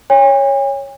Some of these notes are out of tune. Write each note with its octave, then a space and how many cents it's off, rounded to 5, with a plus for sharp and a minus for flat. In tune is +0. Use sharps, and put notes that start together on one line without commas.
C#5 +0 G#5 -45